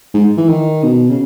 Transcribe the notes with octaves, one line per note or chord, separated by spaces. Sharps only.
G#2
E3
D#3
B2
C#3